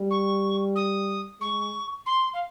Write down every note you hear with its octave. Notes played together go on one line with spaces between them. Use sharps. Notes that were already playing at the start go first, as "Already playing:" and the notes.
Already playing: G3
C#6
D#6
G#3 C#6
C6
F5